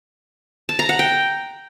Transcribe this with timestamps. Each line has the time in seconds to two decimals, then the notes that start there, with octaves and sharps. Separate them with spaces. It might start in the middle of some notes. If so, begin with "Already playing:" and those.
0.69 A5
0.79 A#5
0.89 F#5
0.99 G5